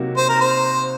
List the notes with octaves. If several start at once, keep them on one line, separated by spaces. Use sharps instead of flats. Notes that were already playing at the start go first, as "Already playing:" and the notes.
Already playing: C3 F#3 A#3 D#4 F#4
C5
A#4
C5